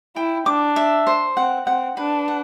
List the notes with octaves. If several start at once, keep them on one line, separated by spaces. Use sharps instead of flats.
E4 G5
D4 D6
E5
C5
C4 F#5
C4 F#5
D4 B4
F#5